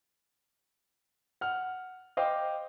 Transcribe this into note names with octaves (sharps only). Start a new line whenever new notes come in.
F#5 F6
C5 D#5 F5 G5 D6